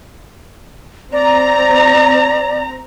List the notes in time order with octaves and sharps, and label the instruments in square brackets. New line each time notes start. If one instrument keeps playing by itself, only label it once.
[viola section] C4 A#5 [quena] D5